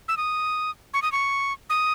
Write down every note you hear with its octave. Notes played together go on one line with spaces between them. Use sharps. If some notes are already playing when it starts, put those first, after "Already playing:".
E6
D#6
C#6
D#6
C#6
D#6